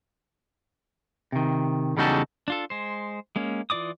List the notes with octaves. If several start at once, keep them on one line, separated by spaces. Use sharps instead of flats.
C3 D#3
E2 C#3 G3 D#4 F#4 A4
D4 F4 A4
G#3 C5
G#3 A#3 C#4
E3 F4 D5 D6 D#6